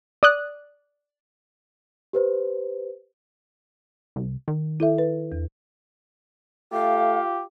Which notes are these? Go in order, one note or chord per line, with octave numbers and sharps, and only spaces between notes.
D5 D#6 F#6
G4 B4 C5
C2
D#3
E4 A4 E5
B4
E2
A3 F4 G4 F5